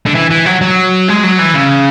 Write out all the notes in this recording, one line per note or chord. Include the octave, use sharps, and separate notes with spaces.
D3
E3
E3
F#3
F#3
G#3
F#3
E3
C#3